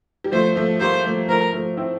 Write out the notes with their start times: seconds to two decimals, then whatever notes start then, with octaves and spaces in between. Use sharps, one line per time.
0.24 G3
0.32 F3 A3 C5
0.56 F3 A3
0.80 G3 A#3 C5
1.05 F3 A3
1.29 F3 A3 A#4
1.53 F3 A3
1.77 C4 E4